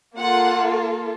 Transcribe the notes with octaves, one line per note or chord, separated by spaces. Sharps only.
A#3 F4 A4 F#5